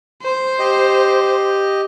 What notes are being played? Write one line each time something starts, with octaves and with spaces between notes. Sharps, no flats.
C5
G4 D#5